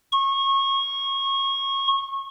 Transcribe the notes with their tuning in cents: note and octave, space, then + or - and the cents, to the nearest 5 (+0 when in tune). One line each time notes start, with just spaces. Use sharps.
C#6 -25